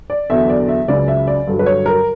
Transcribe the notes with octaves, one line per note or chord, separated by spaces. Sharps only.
D5
E2 D3 F#3 E5
D5
E5
C#2 C#3 F#3 D5
E5
D5
G2 D3 F#3
B4
C#5
A#4